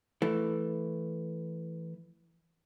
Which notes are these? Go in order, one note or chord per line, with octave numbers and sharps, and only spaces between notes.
E3 A3